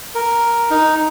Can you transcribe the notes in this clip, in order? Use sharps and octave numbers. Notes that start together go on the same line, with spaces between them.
A#4
D#4